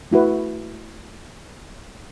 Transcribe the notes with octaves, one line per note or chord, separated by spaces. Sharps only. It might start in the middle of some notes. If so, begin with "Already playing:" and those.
A3 E4 F#4 B4